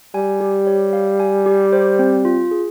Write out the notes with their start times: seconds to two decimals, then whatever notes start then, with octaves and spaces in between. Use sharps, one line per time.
0.14 G3 G#5
0.40 G4
0.67 C#5
0.93 F5
1.20 G#5
1.46 G4
1.73 C5
1.99 C4
2.25 F4
2.51 G#4